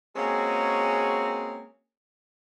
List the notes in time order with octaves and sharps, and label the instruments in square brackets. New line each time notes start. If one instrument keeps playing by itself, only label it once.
[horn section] G#3 A#3 C4 C#4 F#4 G#4